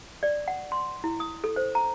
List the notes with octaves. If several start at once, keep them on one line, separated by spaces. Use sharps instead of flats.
D5
F#5
C6
E4
D#6
A4
C5
A#5